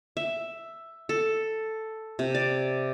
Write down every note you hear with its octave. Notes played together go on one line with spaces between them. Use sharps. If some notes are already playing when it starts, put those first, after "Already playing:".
E5
A4
C3
D5